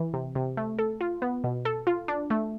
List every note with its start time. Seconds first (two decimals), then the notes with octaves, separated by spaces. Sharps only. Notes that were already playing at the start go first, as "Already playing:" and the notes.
Already playing: E3
0.14 C3
0.35 C3
0.57 A3
0.79 A4
1.01 F4
1.22 B3
1.44 B2
1.65 A4
1.87 F4
2.08 D4
2.30 A3